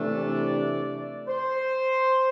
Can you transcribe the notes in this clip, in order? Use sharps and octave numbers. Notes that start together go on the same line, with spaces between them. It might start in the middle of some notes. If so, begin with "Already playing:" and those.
Already playing: C3 E3 A3 D4
D5
C5